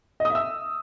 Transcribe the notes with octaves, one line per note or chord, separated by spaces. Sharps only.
D#5
D#6
E5
E6